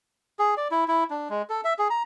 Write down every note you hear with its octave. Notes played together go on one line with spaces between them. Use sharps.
G#4
D5
E4
E4
D4
G#3
A4
E5
G#4
A#5